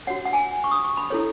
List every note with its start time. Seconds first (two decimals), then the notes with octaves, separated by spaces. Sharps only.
0.07 F#4 C#5 F#5
0.25 F#5
0.33 G#5
0.64 C#6
0.71 D#6
0.84 C#6
0.97 B5
1.10 E4 A4 C#5